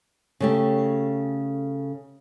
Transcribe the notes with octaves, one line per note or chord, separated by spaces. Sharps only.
C#3 A3 G4